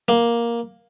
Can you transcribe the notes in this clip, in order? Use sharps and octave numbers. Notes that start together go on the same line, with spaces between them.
A#3